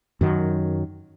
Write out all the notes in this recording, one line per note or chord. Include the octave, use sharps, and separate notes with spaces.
F#2 D#3 F#3